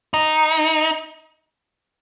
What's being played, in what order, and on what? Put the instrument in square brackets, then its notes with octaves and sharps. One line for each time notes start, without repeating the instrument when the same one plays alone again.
[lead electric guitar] D#4